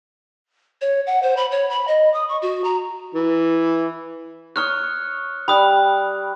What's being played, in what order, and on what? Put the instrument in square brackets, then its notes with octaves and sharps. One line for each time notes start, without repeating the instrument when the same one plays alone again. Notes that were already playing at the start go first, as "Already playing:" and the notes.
[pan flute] C#5
F#5
C5
B5
C#5
B5
D#5
D#6
C#6
F#4
A#5
[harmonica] E3
[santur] C#5 D#6 [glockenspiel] C#6 F6 F#6
[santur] G3 [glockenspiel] B5 D#6 F#6